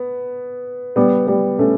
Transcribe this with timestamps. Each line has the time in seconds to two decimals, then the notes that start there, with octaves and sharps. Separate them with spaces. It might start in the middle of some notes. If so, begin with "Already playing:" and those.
Already playing: B3
0.96 G3 B3
1.27 G3 B3
1.59 A3 C#4